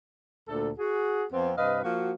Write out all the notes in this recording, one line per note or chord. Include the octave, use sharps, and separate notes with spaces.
D2 A#2 D4 A4
F#4 G#4
F2 B3 C4
G2 C3 B4 D#5 F5
F3 A#3 F#4